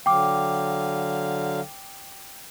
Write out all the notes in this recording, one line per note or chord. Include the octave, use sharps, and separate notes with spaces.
D3 F#3 F5 G5 D6